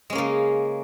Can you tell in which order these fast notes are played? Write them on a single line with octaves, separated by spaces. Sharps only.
G#3 C#4 A#3 C#3